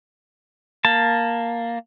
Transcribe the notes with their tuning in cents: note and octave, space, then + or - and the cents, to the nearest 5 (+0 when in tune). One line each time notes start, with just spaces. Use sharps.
A#3 +0 A5 +5